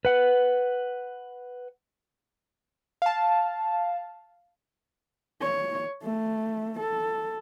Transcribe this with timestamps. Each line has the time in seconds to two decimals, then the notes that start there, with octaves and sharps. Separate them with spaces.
0.05 B4 F#5
3.02 F5 A5
5.42 C#5
6.03 A3
6.79 A4